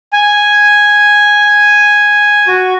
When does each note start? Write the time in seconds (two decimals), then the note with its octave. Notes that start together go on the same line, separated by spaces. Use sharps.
0.13 G#5
2.48 F#4